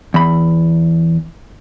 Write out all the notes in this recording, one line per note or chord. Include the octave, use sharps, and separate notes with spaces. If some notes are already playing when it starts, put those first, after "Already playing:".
E2 B5